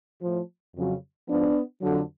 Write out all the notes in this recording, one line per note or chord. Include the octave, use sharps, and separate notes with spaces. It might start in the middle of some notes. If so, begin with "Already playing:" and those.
A2 F3
F2 C#3 F#3
G#2 F3 B3 D4
F2 D3 F#3